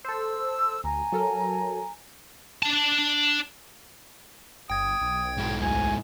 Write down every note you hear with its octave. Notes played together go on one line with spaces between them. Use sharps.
A4 C5 E6
D2 G#5 A#5
F#3 A4 A#4
D4 A5
G1 G5 D#6 G#6
B1
G#2 E4
D2 G#5